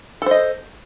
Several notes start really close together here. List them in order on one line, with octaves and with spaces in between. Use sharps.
A4 C5 D#5